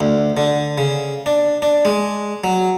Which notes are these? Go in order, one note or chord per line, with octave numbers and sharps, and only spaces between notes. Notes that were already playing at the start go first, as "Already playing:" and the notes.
D2
D3
C#3
D4
D4
G#3
F#3